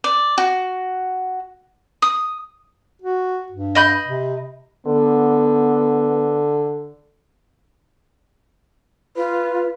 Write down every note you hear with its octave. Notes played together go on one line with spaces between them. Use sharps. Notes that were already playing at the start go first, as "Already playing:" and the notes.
D5
F#4
D#6
F#4
G2
D#5 B5 G6
C3
D3 B3
F4 B4